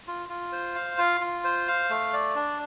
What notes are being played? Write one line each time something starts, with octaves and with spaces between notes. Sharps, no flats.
F4
F4
C5
F5
F4
F4
C5
F5
A3
D5
D4